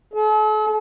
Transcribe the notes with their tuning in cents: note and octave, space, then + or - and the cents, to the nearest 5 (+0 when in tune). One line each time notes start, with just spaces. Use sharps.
A4 -45